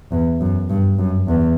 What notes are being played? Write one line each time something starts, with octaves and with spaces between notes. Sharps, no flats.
E2
F#2
G2
F#2
E2